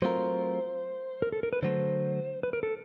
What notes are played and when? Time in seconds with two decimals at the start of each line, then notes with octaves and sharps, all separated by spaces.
0.02 F#3 A3 C4 F4 A#4 C5
1.22 A#4
1.32 A4
1.43 A#4
1.53 B4
1.63 D3 F#3 A3 C5
2.43 B4
2.53 A#4
2.63 A4